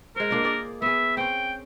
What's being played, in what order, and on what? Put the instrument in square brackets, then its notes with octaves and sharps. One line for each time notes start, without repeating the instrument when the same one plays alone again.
[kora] G#3 C5 [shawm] A#4
[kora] A#3 D4 F4
G#4 D5 D#5
[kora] B3 G#4 [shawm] E5
[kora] C4 C#4 [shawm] G5